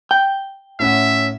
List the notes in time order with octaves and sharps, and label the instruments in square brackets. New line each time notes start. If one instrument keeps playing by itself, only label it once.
[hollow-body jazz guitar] G5
[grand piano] A2 C#4 F#5 [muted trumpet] E5